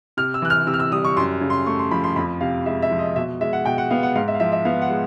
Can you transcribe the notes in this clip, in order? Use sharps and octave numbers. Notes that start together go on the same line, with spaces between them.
C3 F6
E6
E3 F#6
F6
C3 E6
F6
E6
G3 D#6
C#6
F#2 C6
C#3
C6
A3 C#6
C6
F3 B5
C6
F2 B5
C3 F5
G#3 E5
E5
F3
D#5
B2 E5
G#3 E5
F#5
B2 G5
F#5
B3 F5
F#5
G#2 F5
E5
F5
F3 E5
E5
B3 F5
F#5
G#3